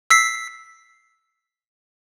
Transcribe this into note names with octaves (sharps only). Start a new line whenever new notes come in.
E6 B6 C7